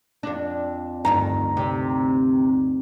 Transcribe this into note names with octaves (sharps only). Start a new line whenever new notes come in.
F2 D4
D2 G2 D#3 A#5
C3